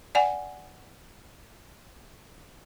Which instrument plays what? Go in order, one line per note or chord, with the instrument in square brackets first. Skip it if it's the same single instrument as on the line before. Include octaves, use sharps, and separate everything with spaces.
[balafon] D5 F#5 G#5